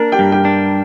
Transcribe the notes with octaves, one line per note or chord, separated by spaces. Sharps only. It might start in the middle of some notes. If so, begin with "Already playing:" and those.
Already playing: A#3 D4 A#4
G4 G5
G2
G4 G5
D4